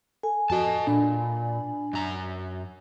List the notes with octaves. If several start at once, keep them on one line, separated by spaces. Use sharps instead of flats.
A4 G#5
F2 F#4 A4 D#5 A5
A#2 D4 D5 B5
F#2 A#5